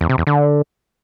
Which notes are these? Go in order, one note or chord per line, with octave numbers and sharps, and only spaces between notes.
E2
C3
E2
D3